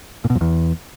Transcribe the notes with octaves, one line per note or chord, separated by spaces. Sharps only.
A#2
B2
F2
E2